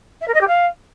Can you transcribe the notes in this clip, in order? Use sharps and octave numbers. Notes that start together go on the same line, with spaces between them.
E5
A#4
D#5
G4
F5